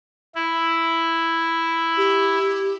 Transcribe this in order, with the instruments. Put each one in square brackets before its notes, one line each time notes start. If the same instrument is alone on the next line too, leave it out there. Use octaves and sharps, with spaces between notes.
[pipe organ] E4
[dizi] G4